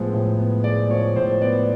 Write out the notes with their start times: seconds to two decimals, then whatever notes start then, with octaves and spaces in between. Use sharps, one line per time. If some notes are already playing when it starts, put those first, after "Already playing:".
Already playing: A2 F3 G#3 B3
0.14 A2
0.38 B3
0.64 G#3 D5
0.90 F3 C#5
1.16 A2 C5
1.42 B3 D5